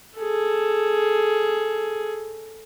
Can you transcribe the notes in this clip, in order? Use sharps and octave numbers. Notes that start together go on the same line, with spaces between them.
G#4 A4